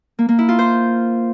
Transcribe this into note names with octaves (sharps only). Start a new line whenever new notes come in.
A#3
A#3
E4
F4
C5